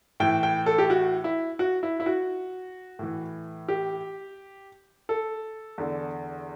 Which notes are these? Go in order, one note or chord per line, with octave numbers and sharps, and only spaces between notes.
A2 E3 G5
G5
A4
G4
F#4
E4
F#4
E4
E4
F#4
A2 E3
G4
A4
E2 D3